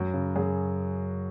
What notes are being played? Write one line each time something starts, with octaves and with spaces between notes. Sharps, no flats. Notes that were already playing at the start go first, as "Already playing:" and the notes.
Already playing: F#2 F#4
C#3
F#2 G#4